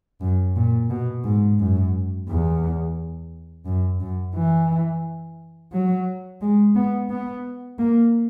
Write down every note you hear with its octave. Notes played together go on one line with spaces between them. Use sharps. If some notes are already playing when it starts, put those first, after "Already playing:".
F#2
A#2
B2
G#2
F#2
E2
F#2
F#2
E3
F#3
G#3
B3
B3
A#3